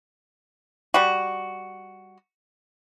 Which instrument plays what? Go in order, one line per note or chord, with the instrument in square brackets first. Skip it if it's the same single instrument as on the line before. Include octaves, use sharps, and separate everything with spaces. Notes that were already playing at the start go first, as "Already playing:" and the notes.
[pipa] G3 F#4